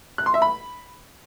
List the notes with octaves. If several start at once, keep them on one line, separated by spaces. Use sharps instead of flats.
F#6
C6
E5
B5